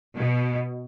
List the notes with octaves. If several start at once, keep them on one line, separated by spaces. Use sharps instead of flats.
B2